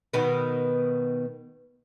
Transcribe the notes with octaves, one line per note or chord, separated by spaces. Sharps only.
B2 D#3 B3